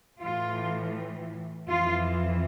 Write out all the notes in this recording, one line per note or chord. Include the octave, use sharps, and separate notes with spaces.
A2 E3 F4
F2 E3 F4